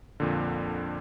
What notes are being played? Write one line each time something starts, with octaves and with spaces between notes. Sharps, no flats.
F2 A#2 D3